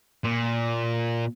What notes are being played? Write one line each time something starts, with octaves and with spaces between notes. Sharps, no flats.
A#2